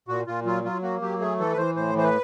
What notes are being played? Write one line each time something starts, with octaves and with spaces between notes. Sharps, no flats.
A#2 F#4
A#2 F4
F#3 F4
F#3 F4
A#3 F#4
F#3 G4
A3 G#4
E3 A4
B4
E3 C5
A2 C5
E3 C5
B4